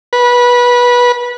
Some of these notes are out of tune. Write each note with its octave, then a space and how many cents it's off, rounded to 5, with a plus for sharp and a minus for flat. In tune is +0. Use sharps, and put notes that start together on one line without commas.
B4 -20